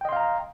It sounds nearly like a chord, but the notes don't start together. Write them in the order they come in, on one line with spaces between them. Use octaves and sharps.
G5 D#5 C6 F5 A#5